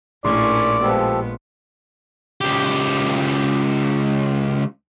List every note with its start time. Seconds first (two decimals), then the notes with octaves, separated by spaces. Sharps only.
0.24 A#1 A2 C#4 E4 D5 C6
0.81 F3 G#3 B3 G4 A4 D7
2.41 C#2 G4